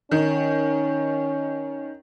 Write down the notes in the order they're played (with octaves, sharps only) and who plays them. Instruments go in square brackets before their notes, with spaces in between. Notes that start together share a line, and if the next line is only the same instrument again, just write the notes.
[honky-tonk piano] D#3 [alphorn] C#4